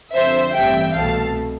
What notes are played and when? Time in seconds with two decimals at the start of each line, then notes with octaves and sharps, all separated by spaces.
0.15 F2 D3 F3 C4 C5 E5
0.55 A1 G2 E3 G3 C4 E5 G5
0.95 C2 B2 A3 F5 A5